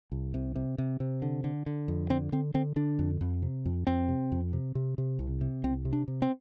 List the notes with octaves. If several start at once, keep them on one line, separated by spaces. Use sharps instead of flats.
C2
C3
C3
C3
C3
D3
D3
D3
F2
D3 C4
D3 C4
D3 C4
D3 D4
F2
F2
C3
F2
F2 C4
C3
F2
C3
C3
C3
C2
C3
C2 C4
C3
D4
C3
C4